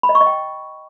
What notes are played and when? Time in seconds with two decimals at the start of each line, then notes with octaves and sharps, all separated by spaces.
0.03 B5
0.09 D#5
0.15 C#6
0.21 D#5
0.27 G5